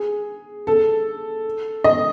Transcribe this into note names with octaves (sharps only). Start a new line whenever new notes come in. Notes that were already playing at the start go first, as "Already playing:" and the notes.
Already playing: G#4
A4
D#5